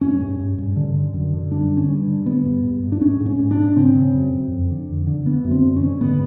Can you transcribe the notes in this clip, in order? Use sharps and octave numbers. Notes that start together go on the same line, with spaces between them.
G2 C#4
G2
G2
G2
D3
D3
F#2
D3
G2 D4
G2
C#4
G2
D3
G2 B3
G2
G2
G2
D4
G#2 C#4
G#2
C#4
G#2
D4
G#2
C#3 C4
C#3
F#2
F#2
F2
D3
F2
D3
D3 B3
F#2
C4
D3
C#4
D3
G#2 B3